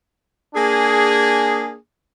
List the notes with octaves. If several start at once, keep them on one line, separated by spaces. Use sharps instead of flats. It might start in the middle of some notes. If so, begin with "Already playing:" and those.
A#3 D4 G#4